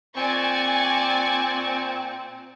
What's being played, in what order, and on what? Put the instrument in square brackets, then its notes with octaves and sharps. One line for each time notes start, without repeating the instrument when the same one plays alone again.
[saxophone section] A#2 C4 [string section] D5 G#5 C#6